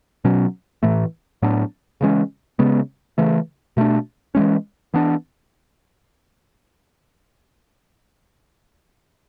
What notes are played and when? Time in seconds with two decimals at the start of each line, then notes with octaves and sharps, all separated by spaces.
0.24 B2 F#3 C#4
0.83 A2 E3 A3
1.42 A2 F#3 B3 D4
2.01 C#3 E3 G#3 C#4
2.59 C#3 G#3 B3
3.18 C#3 E3 A3
3.77 B2 A3 D4
4.35 E3 G#3 C#4
4.94 E3 B3 D4